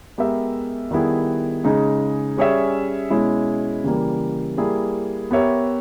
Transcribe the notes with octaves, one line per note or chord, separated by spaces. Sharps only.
G#3 B3 G4 A#4 E5
D#3 G3 B3 E4 G#4
C#3 G#3 D#4 G#4
G3 C#4 G#4 C#5 E5
B2 G#3 C#4 E4
C#3 E3 G3 A#3
G3 A#3 E4 G#4
B3 G4 A#4 C#5 E5